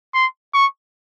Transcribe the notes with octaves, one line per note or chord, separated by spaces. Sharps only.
C6
C#6